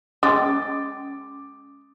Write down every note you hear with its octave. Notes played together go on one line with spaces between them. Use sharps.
G#3 C#4 D6 A6